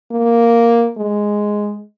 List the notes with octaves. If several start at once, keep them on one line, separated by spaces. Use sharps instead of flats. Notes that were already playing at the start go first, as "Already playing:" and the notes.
A#3
G#3